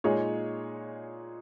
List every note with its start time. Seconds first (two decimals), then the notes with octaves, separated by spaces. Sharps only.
0.04 A#2 G#3 D#4 G#4 C#5